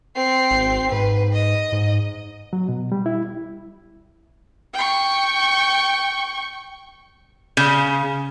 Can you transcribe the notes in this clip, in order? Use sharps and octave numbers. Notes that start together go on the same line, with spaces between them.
C4 C7
G#1
G#2 B4
D#5
G#2
F#3
B2
G3
E4
G5 C#6
C#3